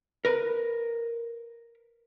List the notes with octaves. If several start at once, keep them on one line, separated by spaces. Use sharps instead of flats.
A#4 B4